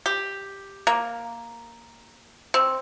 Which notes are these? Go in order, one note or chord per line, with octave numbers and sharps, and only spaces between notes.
G4
A#3
C4